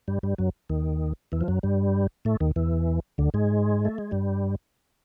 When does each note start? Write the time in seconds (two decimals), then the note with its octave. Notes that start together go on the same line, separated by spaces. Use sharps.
0.08 G2 G3
0.23 G2 G3
0.38 F#2 F#3
0.69 D#2 D#3
1.32 E2 E3
1.41 F3
1.48 F#2 F#3
1.63 G2 G3
2.25 A2 A3
2.40 D#2 D#3
2.56 E2 E3
3.18 D2 D3
3.34 G#2 G#3
3.85 A3
3.98 G#3
4.11 G2 G3